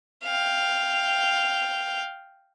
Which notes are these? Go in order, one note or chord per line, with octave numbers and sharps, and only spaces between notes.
F5 G5